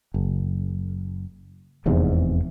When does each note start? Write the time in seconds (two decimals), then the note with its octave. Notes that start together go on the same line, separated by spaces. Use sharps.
0.14 F#1
1.86 F1 E2 G#2 C3